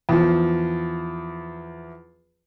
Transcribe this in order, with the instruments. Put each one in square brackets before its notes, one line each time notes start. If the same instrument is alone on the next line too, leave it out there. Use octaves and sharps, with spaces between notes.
[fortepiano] E2 F3